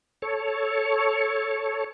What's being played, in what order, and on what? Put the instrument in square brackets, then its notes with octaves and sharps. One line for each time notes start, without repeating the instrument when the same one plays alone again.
[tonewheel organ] A4 C#5